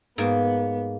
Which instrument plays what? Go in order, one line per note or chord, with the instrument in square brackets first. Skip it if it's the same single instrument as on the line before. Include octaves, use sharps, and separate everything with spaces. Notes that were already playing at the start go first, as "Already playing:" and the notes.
[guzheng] G#2 A#3 [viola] B3